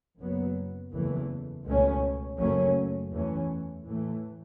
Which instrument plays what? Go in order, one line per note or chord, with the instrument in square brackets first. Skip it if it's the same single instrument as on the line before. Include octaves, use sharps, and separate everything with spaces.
[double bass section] F#1 F#2 F#3 B3
F#1 E2 E3 A3
C#2 B2 A3 C#4
F#1 F#2 F#3 A3 C#4
E2 E3 A3 C#4
A2 E3 A3